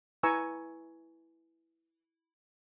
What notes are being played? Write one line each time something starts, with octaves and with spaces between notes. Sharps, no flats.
E4 B4 G#5 A#5 C#6 E6